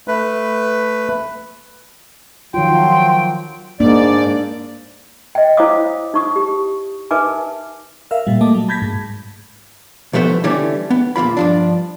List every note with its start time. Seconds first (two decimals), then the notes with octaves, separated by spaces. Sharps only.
0.08 A3 B4
2.54 D#3 F3 F#3 F4 G5 C6
3.80 G#2 A#3 D4 D5
5.35 D#5 G5
5.57 E4 C5 C#5 F5 D6 D#6
6.14 D#4 C#6 D#6
6.36 G4
7.11 D#4 A#4 B4 E5 G#5 D6
8.11 A#4 E5 F5
8.27 A#2 G3
8.41 A3 A#3 D#5 A5 D6
8.55 F#3
8.69 A5 B5 G6 G#6 A#6 B6
8.82 G#2
10.13 B1 F3 A3 B3 C5
10.44 D3 E3 G3 A3 C#4
10.90 B3
11.16 E2 A#2 E3 F4 B5
11.37 G2 F3 D4